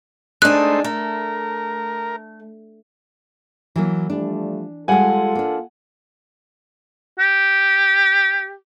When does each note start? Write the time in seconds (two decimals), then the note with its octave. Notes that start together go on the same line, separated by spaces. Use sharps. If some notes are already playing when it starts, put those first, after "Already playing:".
0.42 G#3 A3 D4 D#4 C5 F#6
0.84 A3 A#4
3.76 E3 F#3 A#3
4.10 F3 G3 A3 D4
4.88 G3 G#3 F4 A4 F#5 G#5
5.35 A#3 D4
7.19 G4